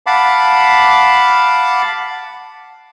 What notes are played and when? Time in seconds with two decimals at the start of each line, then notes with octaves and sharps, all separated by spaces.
0.06 F5 F#5 A5 B5 D6